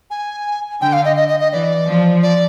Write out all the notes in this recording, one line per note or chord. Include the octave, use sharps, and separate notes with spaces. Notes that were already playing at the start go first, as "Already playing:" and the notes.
G#5
D3 G5
F5
D#5
D#5
D#5
D#5
E3 D5
F3
D5